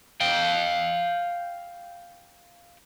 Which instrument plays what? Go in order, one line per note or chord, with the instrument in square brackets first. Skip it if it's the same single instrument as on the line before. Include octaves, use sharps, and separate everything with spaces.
[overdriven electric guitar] F5 G5